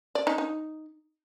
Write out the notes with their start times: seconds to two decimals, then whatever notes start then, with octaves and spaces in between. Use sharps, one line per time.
0.15 D5
0.27 D#4
0.38 D#4